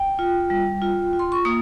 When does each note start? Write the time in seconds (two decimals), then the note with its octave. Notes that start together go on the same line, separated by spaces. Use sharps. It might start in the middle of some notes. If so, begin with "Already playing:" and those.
Already playing: G5
0.19 F4
0.50 G3
0.82 F4
1.13 F4
1.19 C6
1.32 C#6
1.45 A#3 D#6